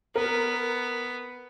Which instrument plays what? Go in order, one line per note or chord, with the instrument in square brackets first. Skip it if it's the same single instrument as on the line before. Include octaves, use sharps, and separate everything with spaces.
[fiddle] B3 [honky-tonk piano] A#4